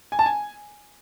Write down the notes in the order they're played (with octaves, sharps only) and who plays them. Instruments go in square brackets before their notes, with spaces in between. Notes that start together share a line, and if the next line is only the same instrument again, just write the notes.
[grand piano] G#5
A5
G#5